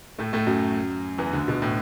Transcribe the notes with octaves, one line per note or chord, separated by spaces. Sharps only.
A2 A3
A2 A3
F#2 F#3
E2 E3
D2 D3
B2
A2